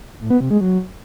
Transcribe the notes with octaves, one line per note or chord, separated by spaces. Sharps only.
A2
B3
C3
G#3
F#3